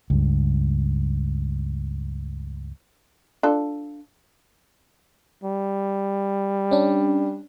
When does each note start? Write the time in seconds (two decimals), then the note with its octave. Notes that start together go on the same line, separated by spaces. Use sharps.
0.10 C#2 G2
3.43 D4 F4 A4
5.43 G3
6.71 C#4 D4